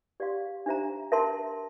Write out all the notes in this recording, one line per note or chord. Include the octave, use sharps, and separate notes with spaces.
G4 D5 F5 C6
D4 G4 C5 E5 A#5
A#4 E5 A5 C6